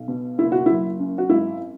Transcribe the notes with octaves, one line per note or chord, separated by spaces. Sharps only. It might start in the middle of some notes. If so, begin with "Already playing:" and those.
Already playing: B1
B2
F#1 E4
F#4
F#3 E4
F#2
F#4
G#1 E4